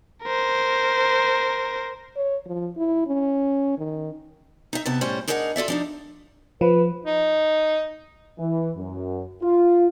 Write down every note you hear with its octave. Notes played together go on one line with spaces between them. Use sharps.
A#4 C5
C#5
F3
E4
C#4
D#3
D#4 E5
C3 B3 A5
A2 G3 C#4 C5
D4 D#4 G#4 A#4 F5 F#5
F4 A4 D5 E5
F3 D4 D#4
F3 B4
D#4
E3
F#2
F4